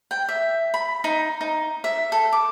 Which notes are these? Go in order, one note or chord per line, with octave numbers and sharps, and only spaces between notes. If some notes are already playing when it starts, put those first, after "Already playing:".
G5
E5
B5
D#4
D#4
E5
A4
D6